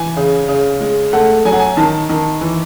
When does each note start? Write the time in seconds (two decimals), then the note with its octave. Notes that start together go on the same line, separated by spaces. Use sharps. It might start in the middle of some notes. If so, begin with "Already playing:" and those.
Already playing: E3 G#5
0.16 C#3
0.48 C#3
0.81 G#3
1.13 A3 F#5
1.45 F#3 G#5
1.53 F#5
1.59 G#5
1.77 D#3 A5
2.09 D#3
2.41 E3